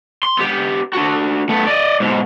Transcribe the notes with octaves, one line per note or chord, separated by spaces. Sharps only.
C6
B3 G4
D4 F#4
A3 B3
D5 D#5
G#2 B2